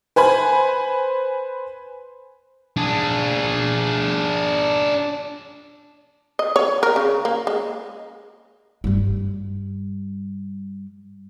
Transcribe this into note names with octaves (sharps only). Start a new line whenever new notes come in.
B4 C5 G#5 B5
D4 G#4
D#5
C#5
A#4
C#3
A#3
G#3
G2 G3